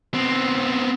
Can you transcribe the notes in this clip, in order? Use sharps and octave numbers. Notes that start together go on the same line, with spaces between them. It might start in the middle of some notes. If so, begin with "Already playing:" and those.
B3 C4